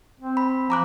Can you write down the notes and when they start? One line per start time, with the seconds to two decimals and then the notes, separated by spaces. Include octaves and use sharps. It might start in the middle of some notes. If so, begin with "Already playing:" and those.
0.20 C4
0.37 B5
0.70 F3 A#5 D6 F#6